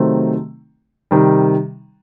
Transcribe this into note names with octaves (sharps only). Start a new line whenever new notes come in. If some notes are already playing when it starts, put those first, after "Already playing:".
Already playing: C3 D#3 F#3 A3 C4
C3 D#3 G3